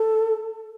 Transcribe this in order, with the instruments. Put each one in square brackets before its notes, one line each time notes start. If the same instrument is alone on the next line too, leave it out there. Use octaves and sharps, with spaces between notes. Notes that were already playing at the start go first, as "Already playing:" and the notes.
Already playing: [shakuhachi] A4